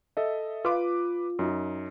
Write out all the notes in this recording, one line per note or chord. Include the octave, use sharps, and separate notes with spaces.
A4 D#5 E5
F4 B4 D6
F#2 D#4